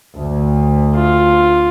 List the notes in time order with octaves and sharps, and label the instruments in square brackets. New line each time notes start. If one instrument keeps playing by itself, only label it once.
[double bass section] D2
[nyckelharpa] F4